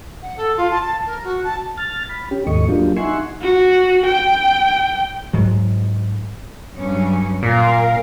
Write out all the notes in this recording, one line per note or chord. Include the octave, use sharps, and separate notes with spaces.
F#5
A4
F4
A5
A5
A#4
F#4
A5
F6 A6
B5
C#4 G4
D#2 G#2 A3 D#5 C#6
F#3 A#3 D4 F4 G4
D#4 E5 F#5 G#5 C6 C#6
F#4
G5
G#2 F#3
G2 F#3 C#4
A#2 A#4 F5